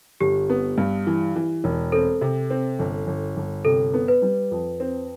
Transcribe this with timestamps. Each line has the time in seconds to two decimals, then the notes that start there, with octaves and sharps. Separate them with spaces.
0.21 G1 G4
0.50 B3
0.78 G2
1.07 E3
1.36 E3
1.64 E1
1.92 C4 A4
2.21 C3
2.50 C4
2.79 G1
3.07 G1
3.37 G1
3.65 C3 A4
3.94 B3
4.08 B4
4.22 G3
4.51 F2
4.80 C4